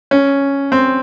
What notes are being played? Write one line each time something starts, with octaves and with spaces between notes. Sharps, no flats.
C#4
C4